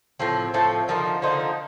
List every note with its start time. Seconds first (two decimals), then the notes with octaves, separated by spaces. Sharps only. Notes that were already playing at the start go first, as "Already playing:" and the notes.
0.19 A2 F3 C4
0.54 A2 F3 C4 A4
0.88 D3 F3 A#3 D#4 A#4
1.22 D3 F3 A#3 D#4 C5